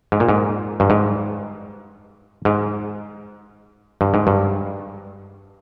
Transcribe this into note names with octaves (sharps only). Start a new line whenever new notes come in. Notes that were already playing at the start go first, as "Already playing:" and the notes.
G#2
A#2
G#2
G2
G#2
G#2
G2
G#2
G2